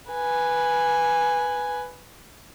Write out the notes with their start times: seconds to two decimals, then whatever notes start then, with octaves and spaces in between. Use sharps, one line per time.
0.12 B4 G#5